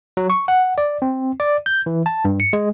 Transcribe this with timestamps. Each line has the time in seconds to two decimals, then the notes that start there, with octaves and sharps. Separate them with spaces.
0.17 F#3
0.30 C#6
0.48 F#5
0.78 D5
1.02 C4
1.40 D5
1.66 G6
1.86 E3
2.06 A5
2.25 G2
2.40 C#7
2.53 G#3